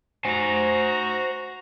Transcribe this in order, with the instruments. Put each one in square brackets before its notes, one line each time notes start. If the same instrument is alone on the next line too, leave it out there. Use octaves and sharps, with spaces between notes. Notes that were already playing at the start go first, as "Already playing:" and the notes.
[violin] F#4 A#5 [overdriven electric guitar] C5 G#5